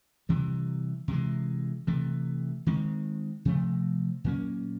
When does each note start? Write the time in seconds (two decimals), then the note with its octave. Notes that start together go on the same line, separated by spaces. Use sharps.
0.29 C3 E3 G3
1.08 C3 E3 G#3
1.87 C3 E3 A3
2.66 D#3 G#3 C4
3.45 C3 F3 A3
4.24 A#2 F#3 A#3 C#4